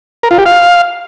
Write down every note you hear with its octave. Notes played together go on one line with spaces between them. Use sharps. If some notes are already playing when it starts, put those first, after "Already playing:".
A#4
F4
G4
F5